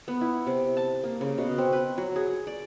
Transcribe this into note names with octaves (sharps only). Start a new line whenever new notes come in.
B3
E4
C3
A5
A#3
C#3
B2
C4
B4
F#3
G#4
D5